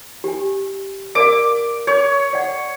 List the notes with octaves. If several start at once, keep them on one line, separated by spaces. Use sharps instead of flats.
G4 G#5
A#4 D5 F5 D6
C#5
D5 F#5